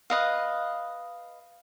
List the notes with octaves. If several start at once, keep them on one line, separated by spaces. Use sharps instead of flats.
B4 D#5 F5